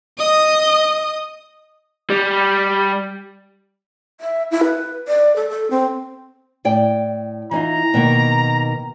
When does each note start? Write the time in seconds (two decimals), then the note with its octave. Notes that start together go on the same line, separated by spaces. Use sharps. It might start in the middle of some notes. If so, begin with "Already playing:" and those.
0.18 D#5 D#6
2.10 G3
4.21 E5
4.51 E4
4.64 B4
5.08 D5
5.36 A4
5.50 A4
5.71 C4
6.65 A2 D5 G5
7.51 E3 D#4 F4 A#5
7.94 B2 D#3 A#3